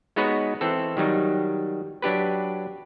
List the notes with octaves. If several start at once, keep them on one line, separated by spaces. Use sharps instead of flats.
G#3 B3 D#4 F#4 B4 C#5
E3 C4 A4
D#3 F#3 G3 D#4
F#3 D4 G4 B4